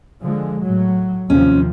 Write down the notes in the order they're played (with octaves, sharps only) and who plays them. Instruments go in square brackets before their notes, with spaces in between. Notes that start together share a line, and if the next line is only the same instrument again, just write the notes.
[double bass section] D3 F3 G#3
A2 F#3
[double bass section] D#2 C3 F3 [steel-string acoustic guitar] C#4